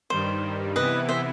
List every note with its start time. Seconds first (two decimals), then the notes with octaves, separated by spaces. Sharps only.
0.10 G2 D#3 G3 C5
0.76 C3 E3 B3 E4 B4 D#5
1.09 C5 E5